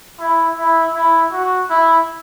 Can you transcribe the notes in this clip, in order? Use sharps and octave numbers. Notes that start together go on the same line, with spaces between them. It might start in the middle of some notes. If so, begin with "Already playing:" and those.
E4
E4
E4
F#4
E4